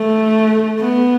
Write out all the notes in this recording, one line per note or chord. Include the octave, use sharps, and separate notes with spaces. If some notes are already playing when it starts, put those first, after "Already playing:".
Already playing: A3
B3